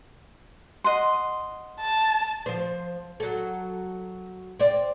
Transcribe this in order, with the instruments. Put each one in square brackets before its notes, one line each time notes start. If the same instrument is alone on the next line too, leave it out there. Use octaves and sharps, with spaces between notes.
[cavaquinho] D#5 F#5 C6
[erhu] A5
[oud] F3 C5
F#3 A4
C4 D5